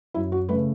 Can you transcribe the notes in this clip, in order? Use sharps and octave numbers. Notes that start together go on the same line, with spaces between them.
F#2 E4
F#4
C#3 A3 B4